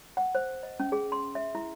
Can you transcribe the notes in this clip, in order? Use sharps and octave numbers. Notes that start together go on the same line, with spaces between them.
F#5
C5
D#5
C#4
G#4
C6
E5
E4